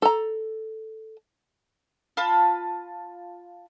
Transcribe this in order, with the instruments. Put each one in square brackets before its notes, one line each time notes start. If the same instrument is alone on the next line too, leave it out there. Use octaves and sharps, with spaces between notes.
[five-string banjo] A4 A#5
[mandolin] F4 A5 B5